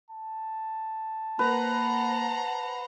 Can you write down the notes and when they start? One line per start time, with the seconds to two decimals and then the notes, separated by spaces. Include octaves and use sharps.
0.10 A5
1.39 A#3 B4 C5 F#5 A#5